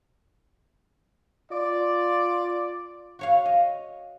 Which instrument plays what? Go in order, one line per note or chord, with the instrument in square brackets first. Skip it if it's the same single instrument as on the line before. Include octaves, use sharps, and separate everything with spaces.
[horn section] F4 D5
[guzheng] F#4 C#5 F5
D#5